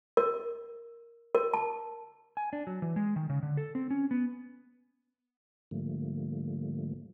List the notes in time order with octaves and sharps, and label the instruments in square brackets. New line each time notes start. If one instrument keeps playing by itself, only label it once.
[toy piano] A#4
A#4
A5
[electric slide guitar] G#5
D4
F#3
E3
G#3
D#3
C#3
D3
A4
C4
C#4
B3
[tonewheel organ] G#2 D3 F3 G3 A3 A#3